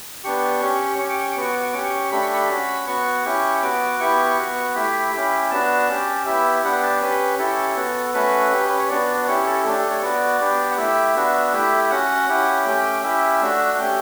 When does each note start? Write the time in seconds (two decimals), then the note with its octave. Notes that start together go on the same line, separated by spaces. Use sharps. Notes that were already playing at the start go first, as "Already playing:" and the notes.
0.24 B3 D4 G4 C#6
0.61 C#4 G4
0.99 C#4 C#6
1.04 G4
1.10 D6
1.21 C#6
1.31 D6
1.36 B3 F#4 C#6
1.52 D6
1.63 C#6
1.73 C#4 G4 D6
1.84 C#6
2.12 A3 D4 G4 B5
2.23 C#6
2.33 B5
2.50 C#4 F#4
2.87 B3 F#4 C#6
3.25 C#4 E4 G4
3.62 B3 F#4 D6
4.00 B3 E4 G4 C#6
4.38 B3 F#4
4.75 A3 E4 G4 B5
5.13 C#4 E4 G4
5.51 B3 D4 F#4 A5
5.89 C#4 G4
6.25 B3 E4 G4 E5
6.63 B3 D4 G4 F#5
6.83 A5
7.01 C#4 G4 B4
7.39 C#4 E4 G4 A4
7.76 B3 F#4
8.14 A3 C#4 F#4 B4
8.52 C#4 G4
8.69 B4
8.79 C#5
8.89 B3 D4 F#4 D5
9.27 C#4 E4 G4 C#5
9.46 A4
9.64 A3 D4 G4 A4
9.91 C#5
10.02 B3 F#4 D5
10.41 B3 D4 G4
10.71 F#5
10.77 A3 E4 G4 E5
11.15 B3 D4 F#4
11.53 A3 E4 G4
11.90 C#4 F#4 F#5
12.29 C#4 E4 G4
12.65 A3 C#4 G4 G5
12.84 G5
13.03 C#4 E4 G4 E5
13.41 A3 D4 F#4
13.79 A3 C#4 G4 G5